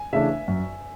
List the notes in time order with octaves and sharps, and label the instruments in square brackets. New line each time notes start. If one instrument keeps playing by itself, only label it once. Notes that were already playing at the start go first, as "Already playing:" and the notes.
Already playing: [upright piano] G#5
[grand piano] C#3 E3 A3 D4 [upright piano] E5
[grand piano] F#2